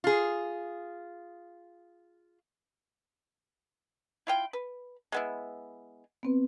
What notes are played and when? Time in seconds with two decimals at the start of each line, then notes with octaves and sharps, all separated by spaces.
0.04 F4 G#4
4.27 E4 F4 G5
4.53 B4
5.12 G#3 B3 E4
6.23 B3 C4 B4